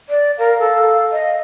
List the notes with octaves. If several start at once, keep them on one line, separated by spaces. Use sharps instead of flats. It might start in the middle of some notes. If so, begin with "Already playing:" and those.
D5
A#4 F5
A4
D#5